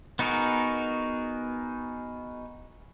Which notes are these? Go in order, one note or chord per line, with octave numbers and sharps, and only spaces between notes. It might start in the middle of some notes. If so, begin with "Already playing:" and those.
B3 D#4 F#4 G#4 A#4